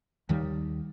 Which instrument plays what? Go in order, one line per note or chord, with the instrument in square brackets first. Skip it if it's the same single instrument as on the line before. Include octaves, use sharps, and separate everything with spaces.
[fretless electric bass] D#2 D#3 G3